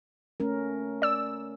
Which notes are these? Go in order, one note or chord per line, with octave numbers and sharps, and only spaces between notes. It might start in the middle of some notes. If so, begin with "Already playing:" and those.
A3 C#4 A#4
D5 E6